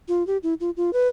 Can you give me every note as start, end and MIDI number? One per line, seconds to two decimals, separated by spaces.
0.08 0.25 65
0.27 0.37 67
0.43 0.54 64
0.60 0.70 65
0.77 0.93 65
0.93 1.08 71